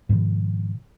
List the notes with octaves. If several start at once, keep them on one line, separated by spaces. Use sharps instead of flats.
G#2 B2 D#3 F3